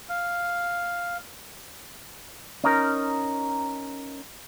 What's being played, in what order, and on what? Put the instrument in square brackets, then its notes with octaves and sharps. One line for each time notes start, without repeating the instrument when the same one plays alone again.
[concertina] F5
[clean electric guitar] C#4 D#4 A#4